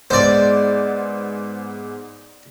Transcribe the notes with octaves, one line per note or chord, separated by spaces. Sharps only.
G#2 G#3 B3 C5 D5